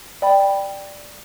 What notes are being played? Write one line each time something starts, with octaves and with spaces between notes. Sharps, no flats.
D5 G5 B5